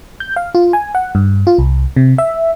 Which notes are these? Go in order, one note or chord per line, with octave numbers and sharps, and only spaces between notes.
G6
F5
F4
G#5
F#5
G2
F4
C2
C3
E5